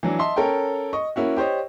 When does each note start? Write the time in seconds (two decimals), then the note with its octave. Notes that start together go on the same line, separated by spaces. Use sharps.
0.03 E3 F#3 D4
0.19 D#5 E5 A5 C6
0.36 C#4 A4 A#4 C#5 G5
0.93 D#5 C#6
1.16 A#3 C#4 E4 F#4
1.37 G4 C5 C#5 D#5